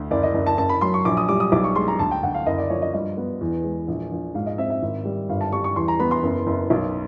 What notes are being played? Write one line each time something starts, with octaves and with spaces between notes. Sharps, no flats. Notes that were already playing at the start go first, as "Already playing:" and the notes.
Already playing: D2
F#1 D5
D#5
F#1
A5
F#1 A5
B5
F#3 C6
C#6
A#1 D6
D#6
G3 D6
D#6
B1 D6
C#6
G#3 C6
A#5
D2 A5
G5
D2 F#5
F5
F#1 D#5
D5
F3 C#5
D#5
G2 D#5
B3
E2
G#3
A#1
A#1
G#2 F5
D#5
C4 E5
E5
G#1
G3
G1 F5
A5
G3 C#6
C#6
E2 C6
A#5
B3 B5
C6
F#1
F#1
B1